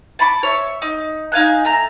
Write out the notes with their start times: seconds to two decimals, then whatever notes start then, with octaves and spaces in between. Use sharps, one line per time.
0.19 A5 B5 C#6 D6
0.43 C#5 E5
0.82 D#4
1.32 D#4 F5 G#5 F#6
1.65 A3 A#5